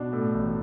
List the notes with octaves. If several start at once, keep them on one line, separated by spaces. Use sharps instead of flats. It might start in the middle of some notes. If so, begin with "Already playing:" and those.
Already playing: B2 D4
A2 A4
A1